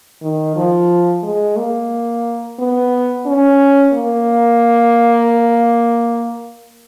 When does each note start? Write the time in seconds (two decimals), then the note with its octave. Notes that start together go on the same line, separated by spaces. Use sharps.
0.22 D#3
0.57 F3
1.23 G#3
1.57 A#3
2.59 B3
3.27 C#4
3.93 A#3